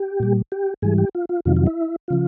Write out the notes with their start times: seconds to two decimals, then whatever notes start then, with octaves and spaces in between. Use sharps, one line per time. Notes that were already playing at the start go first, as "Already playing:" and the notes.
Already playing: G4
0.20 A#2 G3
0.52 G4
0.82 G#2 E3 G3 G#4
0.98 G4
1.15 F4
1.29 F4
1.45 F2 C3 D#3 F#3 F4
1.56 F4
1.67 E4
2.08 C#3 F3 F4